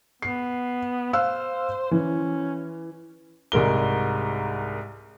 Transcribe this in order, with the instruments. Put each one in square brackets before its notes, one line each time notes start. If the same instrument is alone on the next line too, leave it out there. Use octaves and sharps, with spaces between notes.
[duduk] B3 [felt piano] C7
[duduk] C5 [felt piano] F5 E6 F#6
[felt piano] E3 [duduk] C#4
[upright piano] C2 G#2 A#4 G7